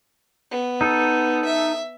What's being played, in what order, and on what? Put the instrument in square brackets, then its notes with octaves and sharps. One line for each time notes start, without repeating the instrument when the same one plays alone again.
[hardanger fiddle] B3
[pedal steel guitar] D#4 A4
[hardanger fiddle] E5